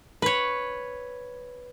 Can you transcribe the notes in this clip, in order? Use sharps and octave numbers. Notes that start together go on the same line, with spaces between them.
B4 C#5